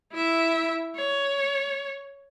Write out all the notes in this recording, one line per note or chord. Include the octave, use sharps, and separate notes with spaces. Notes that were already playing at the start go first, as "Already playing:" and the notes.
E4 E5
C#5